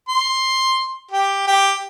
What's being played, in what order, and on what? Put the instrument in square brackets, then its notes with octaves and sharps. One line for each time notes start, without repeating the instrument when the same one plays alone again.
[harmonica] C6
G4
G4